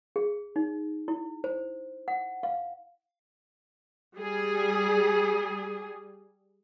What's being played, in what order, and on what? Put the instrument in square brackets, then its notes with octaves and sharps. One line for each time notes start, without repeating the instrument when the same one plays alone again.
[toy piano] G#4
D#4
E4
C5
F#5
F5
[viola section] G3 G#4